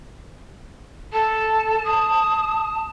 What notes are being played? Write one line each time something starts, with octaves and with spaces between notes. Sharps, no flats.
A4 A5
D#6